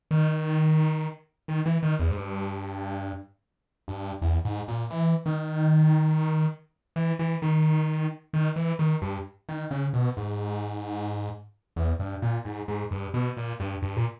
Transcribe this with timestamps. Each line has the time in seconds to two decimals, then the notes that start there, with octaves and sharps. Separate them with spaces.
0.11 D#3
1.48 D#3
1.66 E3
1.83 D#3
1.99 E2
2.11 G#2
2.16 G2
3.88 G2
4.22 E2
4.45 G#2
4.68 A#2
4.90 E3
5.26 D#3
6.96 E3
7.19 E3
7.42 D#3
8.33 D#3
8.56 E3
8.79 D#3
9.02 G2
9.49 D#3
9.71 C#3
9.93 B2
10.17 G#2
11.76 E2
11.99 G2
12.22 A#2
12.45 G#2
12.68 G#2
12.91 G2
13.14 B2
13.37 A#2
13.60 G2
13.82 G2
13.96 A#2